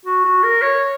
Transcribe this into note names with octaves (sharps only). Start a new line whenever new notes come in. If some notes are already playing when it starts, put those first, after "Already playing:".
F#4
F#4
A#4
C#5